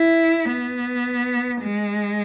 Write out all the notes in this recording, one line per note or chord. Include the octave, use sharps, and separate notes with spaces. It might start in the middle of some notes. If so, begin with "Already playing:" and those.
Already playing: E4
B3
G#3